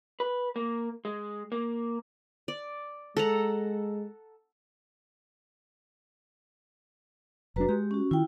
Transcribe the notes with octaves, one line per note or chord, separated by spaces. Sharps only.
B4
A#3
G#3
A#3
D5
G#3 A4 F#5 A#5
F1 F#3 D4 F#4 B4 A#5
G#3 G4
C#4 F#4
D#3 E4 F4 G5